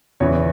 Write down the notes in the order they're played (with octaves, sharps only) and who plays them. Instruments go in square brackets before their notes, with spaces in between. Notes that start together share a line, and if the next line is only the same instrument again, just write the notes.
[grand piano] E2 C#3 E3 C#5